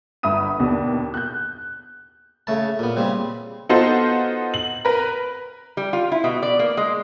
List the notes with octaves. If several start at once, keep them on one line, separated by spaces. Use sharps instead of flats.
G1 E5 B5 D#6 D#7
D#2 B2 B3 D4
F#6 G6
C#3 A3 A5
A#2 B3
C#3 G3 C4
B3 D#4 F4 F#4 A4 C5
F#7
A#4 B4
G3
F4
E4
B2
D5
A#3
G#3